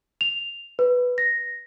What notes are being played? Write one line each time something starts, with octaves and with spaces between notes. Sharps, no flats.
F7
B4
A#6